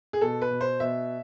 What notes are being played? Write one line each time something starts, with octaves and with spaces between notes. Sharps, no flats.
G#4
B2 A4
B4
B2
C5
B2 E5